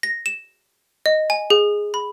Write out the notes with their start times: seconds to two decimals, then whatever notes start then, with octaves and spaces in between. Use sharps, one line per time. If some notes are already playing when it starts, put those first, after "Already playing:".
0.03 A#6
0.26 E7
1.06 D#5
1.30 G#5
1.50 G#4
1.94 B5